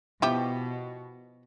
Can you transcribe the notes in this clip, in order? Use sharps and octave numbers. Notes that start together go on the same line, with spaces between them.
B2 F3 E4 G4